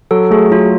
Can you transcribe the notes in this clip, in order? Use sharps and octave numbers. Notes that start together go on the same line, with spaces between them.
F#3 A4
A3 G#4
F#3 F4